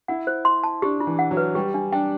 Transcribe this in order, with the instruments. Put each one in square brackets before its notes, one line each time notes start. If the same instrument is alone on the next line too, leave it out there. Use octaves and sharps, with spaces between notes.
[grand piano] E4 [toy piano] F#5
[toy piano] C5
C6
A5
[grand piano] D4 [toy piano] G4
[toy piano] E4
[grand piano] E3
[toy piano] F#5
[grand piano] F#3
[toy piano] B4
[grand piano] G3 [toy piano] G4
[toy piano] D4
[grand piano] D4 [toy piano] G5